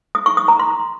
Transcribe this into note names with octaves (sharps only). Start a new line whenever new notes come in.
D#6
C#6
D#6
A#5
C6